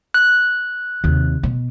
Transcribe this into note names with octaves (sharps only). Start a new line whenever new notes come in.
F#6
D#2 C3
B2